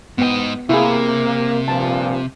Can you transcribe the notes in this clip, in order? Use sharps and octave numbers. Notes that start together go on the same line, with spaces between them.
G#2 B3 D#5 G5
C3 A#3 E4 G#4
G2 A#2 F3 A5